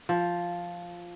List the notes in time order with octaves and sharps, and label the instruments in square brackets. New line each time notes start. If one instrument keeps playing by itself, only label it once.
[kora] F3